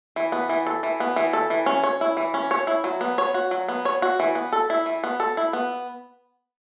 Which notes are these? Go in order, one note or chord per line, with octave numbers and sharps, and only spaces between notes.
E3
B3
E3
A4
E3
B3
E3
A4
E3
C#4
C#5
E4
E3
C#4
C#5
E4
F#3
B3
C#5
F#4
F#3
B3
C#5
F#4
E3
B3
A4
E4
E3
B3
A4
E4
B3